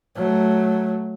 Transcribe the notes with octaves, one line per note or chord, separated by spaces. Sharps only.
F#3 A3